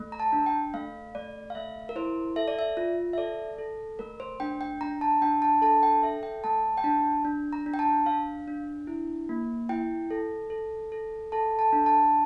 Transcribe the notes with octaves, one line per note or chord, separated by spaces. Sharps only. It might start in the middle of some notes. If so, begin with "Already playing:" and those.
Already playing: A3
A#5
A5
D4
G5
A3 F5
A3 D5
F5
A3 E5
A#4
E4 C5
A4 E5
D5
E5
F4
E5
A4 D5
A4
A3 A#4
C5
D4 G5
G5
D4 A#5
A5
D4 G5
A5
A4 A5
G5
A4 E5
G5
A3 A5
G5
D4 A5
D4
A#5
D4
G5
A5
D4 F5
D4
E4
A#3
E4 G5
A4
A4
A4
A4 A5
A5
D4
A5